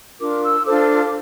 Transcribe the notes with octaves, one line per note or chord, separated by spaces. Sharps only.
D4 F4 A#4 D6
E6
D4 F4 A4 C5 D6